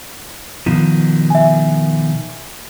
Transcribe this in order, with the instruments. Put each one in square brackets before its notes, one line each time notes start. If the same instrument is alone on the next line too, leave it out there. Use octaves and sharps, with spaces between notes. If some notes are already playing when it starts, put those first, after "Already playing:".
[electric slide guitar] B2 D#3 F3
[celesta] E5 G#5